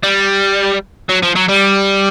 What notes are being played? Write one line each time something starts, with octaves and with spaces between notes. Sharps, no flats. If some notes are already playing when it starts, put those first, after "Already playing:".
G3
F#3
F3
F#3
G3